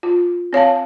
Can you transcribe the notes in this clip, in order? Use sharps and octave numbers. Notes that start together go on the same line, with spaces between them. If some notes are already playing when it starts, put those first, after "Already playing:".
F4
C4 C#5 F5 A5